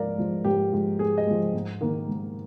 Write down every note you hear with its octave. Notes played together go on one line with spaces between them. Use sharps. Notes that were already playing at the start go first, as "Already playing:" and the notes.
Already playing: G#2 F3 G#3 A#4 D5 F5
F3 G#3
G#2 G4
F3 G#3
G#2 G#4
D#5
F3 G#3
G#2
D#3 A#3
G#2